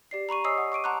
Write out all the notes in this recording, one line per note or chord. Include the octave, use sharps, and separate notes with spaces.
G4 D5 C7
A#5 B5 C#6 D#7
C#5 D#5 G#5 D#6 E6 C7
F#5
C#6 D6 D7 D#7
F#5 A5 A#5 C6 D6 F#6